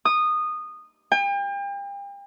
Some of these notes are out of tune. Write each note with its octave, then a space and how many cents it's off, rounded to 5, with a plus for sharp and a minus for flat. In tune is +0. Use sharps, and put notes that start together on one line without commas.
D#6 -15
G5 +40